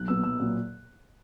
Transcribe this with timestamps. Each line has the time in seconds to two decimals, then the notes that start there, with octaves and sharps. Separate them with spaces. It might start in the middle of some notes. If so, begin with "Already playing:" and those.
Already playing: B1 F#6
0.08 A#2 F#3 B3 E6
0.24 B1 E6
0.39 A#2 F#3 B3